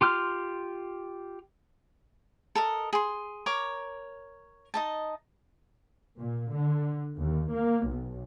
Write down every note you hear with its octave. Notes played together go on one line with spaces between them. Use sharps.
F4 G4 C6 F6
A4 A#4 D#5
G#4 C6
A#4 C#5 D6
D#4 D#5 A5
A#2
D3
D#2
A#3
B1